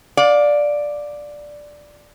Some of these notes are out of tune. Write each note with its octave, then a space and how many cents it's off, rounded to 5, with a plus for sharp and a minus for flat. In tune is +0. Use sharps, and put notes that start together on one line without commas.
D5 +0 F5 +30